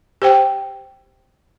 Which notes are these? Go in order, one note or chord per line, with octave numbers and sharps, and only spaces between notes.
G4 C5 G5